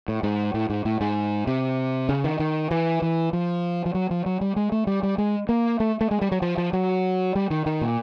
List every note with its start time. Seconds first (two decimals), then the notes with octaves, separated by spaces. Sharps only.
0.08 A2
0.23 G#2
0.54 A2
0.70 G#2
0.85 A2
1.01 G#2
1.47 C3
2.09 C#3
2.24 D#3
2.40 D#3
2.71 E3
3.02 E3
3.33 F3
3.86 F3
3.95 F#3
4.11 F3
4.26 F#3
4.41 G3
4.56 G#3
4.72 A3
4.87 G3
5.03 G3
5.18 G#3
5.49 A#3
5.80 A3
6.01 A3
6.11 G#3
6.22 G3
6.32 F#3
6.42 F3
6.58 F3
6.73 F#3
7.35 G3
7.50 D#3
7.66 D#3
7.81 A#2